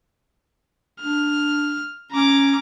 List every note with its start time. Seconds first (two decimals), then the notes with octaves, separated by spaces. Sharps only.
1.01 D4 F6
2.13 C#4 A#5 D6